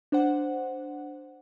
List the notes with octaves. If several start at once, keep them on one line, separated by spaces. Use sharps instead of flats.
D4 C5 F#5